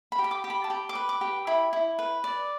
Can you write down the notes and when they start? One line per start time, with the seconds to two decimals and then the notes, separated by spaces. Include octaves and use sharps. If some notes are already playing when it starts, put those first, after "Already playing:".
0.12 B5
0.19 G4
0.24 B5
0.31 D6
0.44 G4
0.50 B5
0.64 A5
0.70 G4 B5
0.89 D6
0.95 B4
1.09 D6
1.21 G4
1.47 E4 B5
1.73 E4
1.99 B4
2.24 D5